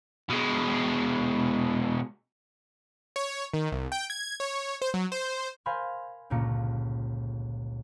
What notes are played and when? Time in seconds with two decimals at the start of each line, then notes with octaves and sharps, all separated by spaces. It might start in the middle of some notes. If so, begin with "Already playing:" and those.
0.30 B2 G#3
3.16 C#5
3.54 D#3
3.72 C2
3.92 G5
4.10 G#6
4.40 C#5
4.82 C5
4.94 F#3
5.12 C5
5.66 A#4 C5 F5 G#5 B5 C6
6.30 G1 C#2 A#2 A#3 C#7